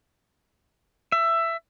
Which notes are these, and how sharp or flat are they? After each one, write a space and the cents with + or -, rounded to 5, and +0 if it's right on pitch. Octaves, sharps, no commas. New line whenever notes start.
E5 +15